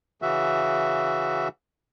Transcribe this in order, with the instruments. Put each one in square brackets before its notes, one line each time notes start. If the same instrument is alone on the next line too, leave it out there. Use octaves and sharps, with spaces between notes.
[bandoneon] C#3 E3 F#4 E5